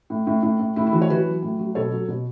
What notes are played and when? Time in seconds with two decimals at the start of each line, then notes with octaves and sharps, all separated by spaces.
0.10 A2
0.27 A2
0.43 A2
0.59 A2
0.76 A2 E4
0.87 E4
0.93 E3 F#4
1.02 C#5
1.10 E3 F#4 B4
1.26 F#3
1.42 A2
1.59 F#3
1.75 B2 A4 C#5
1.92 F#3
2.08 B2